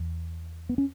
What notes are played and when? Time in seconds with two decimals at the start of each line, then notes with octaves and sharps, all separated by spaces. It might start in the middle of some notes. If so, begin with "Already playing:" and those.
Already playing: E2
0.69 B3
0.78 C#4